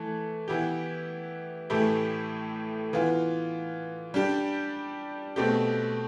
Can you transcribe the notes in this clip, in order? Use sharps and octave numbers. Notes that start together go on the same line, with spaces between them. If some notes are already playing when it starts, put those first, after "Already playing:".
Already playing: E3 A3
E3 B3 E4 G4
A2 E3 A3 E4 G4
E3 B3 F4
G3 D4 G4
B2 A3 C4 G4